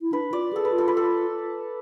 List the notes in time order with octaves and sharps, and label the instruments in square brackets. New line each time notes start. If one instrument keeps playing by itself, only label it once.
[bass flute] E4
[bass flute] D4 [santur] B4
[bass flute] F4 [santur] D5
[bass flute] G#4 [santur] A4
[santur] B4
[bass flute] F4
[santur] A4
B4
A4